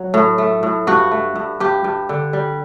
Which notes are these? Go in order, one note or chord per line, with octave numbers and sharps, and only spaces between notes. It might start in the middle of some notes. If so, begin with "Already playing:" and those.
Already playing: F#3
A2
A3
A2
G2 F#4
A3
G2
G2 G4
G2
D3
G3